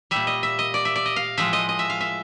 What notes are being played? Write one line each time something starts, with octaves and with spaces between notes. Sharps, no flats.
A#2 G3 E5
D#5
E5
D#5
D5
E5
D5
D#5
F5
A2 F3 G#3 E5
D#5
D#5
E5
F5
E5